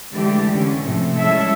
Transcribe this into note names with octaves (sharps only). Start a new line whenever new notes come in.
D3 E3 G#3 A3 G4 D5
D3 C#4
A2 C3 E3 F3 A3
G3 G#3 C#4 E4 A4 E5